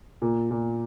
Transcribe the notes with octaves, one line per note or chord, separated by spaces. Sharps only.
A#2
A#2